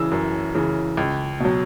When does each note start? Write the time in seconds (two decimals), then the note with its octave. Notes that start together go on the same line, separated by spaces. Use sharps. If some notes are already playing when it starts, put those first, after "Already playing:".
Already playing: C#3 E3 E6
0.11 F#2
0.55 C#3 E3
0.97 C#2
1.40 B2 F#3